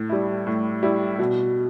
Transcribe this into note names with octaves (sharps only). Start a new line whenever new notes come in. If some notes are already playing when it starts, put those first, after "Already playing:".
Already playing: A2
G3 E4
A2
G3 E4
B2